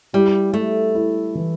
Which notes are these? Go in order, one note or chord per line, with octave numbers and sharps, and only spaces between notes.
G3 E4
G3 A3
E4
E3